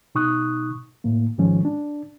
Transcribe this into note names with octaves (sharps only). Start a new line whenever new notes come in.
B2 D#4 C#6 D#6 F#6
A2 A#3
G#2 D#3 F3 G#3 C#4
D4